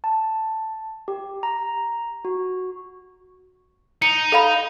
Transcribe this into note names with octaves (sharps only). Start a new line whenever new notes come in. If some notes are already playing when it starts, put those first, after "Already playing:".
A5
G4
A#5
F#4
D#4 C#7
A4 F5 B5